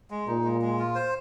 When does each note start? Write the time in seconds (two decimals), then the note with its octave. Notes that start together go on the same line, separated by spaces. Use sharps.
0.10 G#3
0.27 A#2 D#4
0.44 G#3
0.61 G#3
0.79 F4
0.95 C5